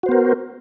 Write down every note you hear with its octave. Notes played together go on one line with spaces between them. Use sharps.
B3 F#4 A#4 C5